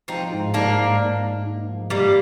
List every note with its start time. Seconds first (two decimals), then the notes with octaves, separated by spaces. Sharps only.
0.08 F3 C4 D#4
0.32 G#2
0.54 G#2 A#3 D4
0.77 G#2
1.01 A#3
1.23 D#4
1.46 D#4
1.69 F3
1.90 G2 G3 A#3